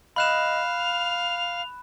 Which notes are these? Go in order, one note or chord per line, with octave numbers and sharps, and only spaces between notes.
D#5 F5 B5 F#6 E7
F7